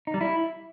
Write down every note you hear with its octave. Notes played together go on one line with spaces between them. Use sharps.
D#4
G3
E4